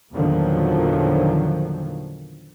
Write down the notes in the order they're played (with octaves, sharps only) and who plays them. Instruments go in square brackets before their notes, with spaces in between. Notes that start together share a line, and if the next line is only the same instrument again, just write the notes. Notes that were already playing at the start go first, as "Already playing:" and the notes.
[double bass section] E2 A#2 D3 D#3 F3 F#3